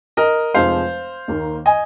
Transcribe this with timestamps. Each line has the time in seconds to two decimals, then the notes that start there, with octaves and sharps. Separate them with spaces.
0.17 A#4 D#5
0.54 F1 F2 F3 G#3 C5 F5
1.28 D#2 D#3 A#3
1.66 D#5 G#5